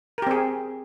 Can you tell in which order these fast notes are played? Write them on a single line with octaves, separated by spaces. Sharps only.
A#4 G4 C4 G#4